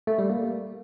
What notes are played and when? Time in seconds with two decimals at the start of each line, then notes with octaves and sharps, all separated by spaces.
0.07 A3
0.19 G3
0.30 A#3